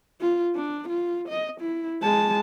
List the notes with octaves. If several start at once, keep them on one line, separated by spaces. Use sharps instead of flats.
F4
D4
F4
D#5
E4
G#3 A5